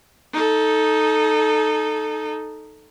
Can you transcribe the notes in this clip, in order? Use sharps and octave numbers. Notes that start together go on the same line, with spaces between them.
D#4 A4